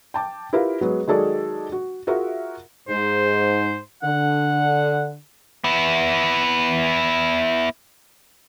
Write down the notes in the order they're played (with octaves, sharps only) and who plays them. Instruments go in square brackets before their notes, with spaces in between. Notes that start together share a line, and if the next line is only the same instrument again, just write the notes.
[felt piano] G5 A5 D6
E4 F4 G4 A#4 B4 F5
F#3 G#3 B3
D#3 F#3 G#3 G#4 A4 D5
F#4
F4 F#4 G#4 A#4 E5 F#5
[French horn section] G#2 [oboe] C5
[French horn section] D3 [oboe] F#5
[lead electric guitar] B3 E4